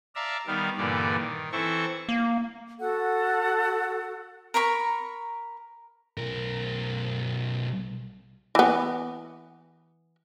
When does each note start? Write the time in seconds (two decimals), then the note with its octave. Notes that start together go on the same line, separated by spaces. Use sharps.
0.15 D5 E5 F5 A5 A#5
0.47 D#3 G3 B3 F5
0.77 G2 A#2 D3 E3 D5
1.17 D#3
1.52 E3 C4 E4 A4 C5 C#6
2.09 A#3
2.79 F#4 A4 F#5
4.54 A#4 A#5 B5 C#6
6.18 B1 A#4
8.55 E3 B3